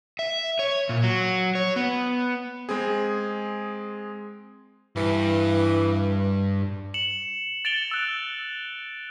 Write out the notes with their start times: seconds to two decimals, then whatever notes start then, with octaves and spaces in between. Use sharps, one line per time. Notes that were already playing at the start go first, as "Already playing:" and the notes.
0.19 E5
0.59 C#5
0.89 A#2
1.03 F#3
1.55 C#5
1.76 B3
2.69 G#3 C4 G#4
4.96 G2 E3
6.94 C#7 E7 F#7
7.65 A6 D7 F7 G7
7.91 E6 F#6